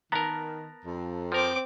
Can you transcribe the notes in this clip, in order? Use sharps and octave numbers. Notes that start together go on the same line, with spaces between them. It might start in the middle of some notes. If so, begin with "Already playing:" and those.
D#3 B3 A#4 A5 A#5 A#6
F2
F3 C4 A#4 D6